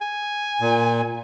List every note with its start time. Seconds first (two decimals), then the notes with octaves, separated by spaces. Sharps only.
0.01 G#5
0.61 A#2